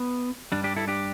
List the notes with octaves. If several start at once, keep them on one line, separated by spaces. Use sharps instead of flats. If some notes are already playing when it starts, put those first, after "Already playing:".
Already playing: B3
G2 G3 D4
D4 G4
E4 A4
D4 G4